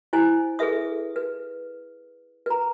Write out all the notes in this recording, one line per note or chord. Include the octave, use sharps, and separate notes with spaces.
E4 C5 G#5
G#4 A4 B4 E5 D#6
B4
B4 A#5